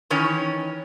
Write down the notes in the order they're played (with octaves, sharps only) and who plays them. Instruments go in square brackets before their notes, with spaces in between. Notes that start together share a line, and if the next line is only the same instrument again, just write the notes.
[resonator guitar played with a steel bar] D#3 E3 C#4 C#5